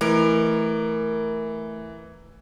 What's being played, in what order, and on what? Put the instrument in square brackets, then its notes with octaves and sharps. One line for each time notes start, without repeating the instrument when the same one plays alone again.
[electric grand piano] E3 [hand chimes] A3 D7 [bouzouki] A#4